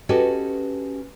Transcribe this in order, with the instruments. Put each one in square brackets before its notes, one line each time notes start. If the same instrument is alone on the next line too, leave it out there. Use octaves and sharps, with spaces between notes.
[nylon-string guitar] C#4 F#4 G4 A4 B4 D#5